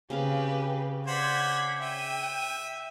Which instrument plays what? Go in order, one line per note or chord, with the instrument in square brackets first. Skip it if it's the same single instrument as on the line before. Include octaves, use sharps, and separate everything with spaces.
[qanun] C#3 C4 F5 [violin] G4 B4
[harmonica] C5 D5 F#5 [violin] G#6 B6
[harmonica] E5 [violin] G5 D#7